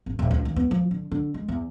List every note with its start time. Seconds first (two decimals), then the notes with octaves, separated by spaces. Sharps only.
0.06 G#1
0.19 D#1
0.31 C#2
0.45 D#2
0.56 B3
0.71 F3
0.91 D3
1.11 D3
1.34 G#3
1.48 E2